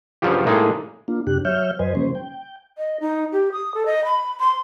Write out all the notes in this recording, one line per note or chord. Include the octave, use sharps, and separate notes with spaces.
G2 C#3 F3 F#3 F4 G4
A2 G#3 A#3 D#4 G#4 A4
A#3 D4 F4
F#2 C3 D4 G4 F#6
F#3 C#5 E5 F6 G6
F#2 F#3 B4 C5 D#5 G#5
C#3 F3 G3 A#3 C#4 C5
G5
D#5
D#4
G4
D#6
A4
D#5
B5
C6